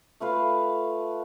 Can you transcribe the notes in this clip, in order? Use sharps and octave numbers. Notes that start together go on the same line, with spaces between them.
A3 F4 B4 F5